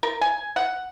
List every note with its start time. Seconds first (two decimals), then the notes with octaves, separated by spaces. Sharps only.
0.03 A#4
0.21 G#5
0.56 F#5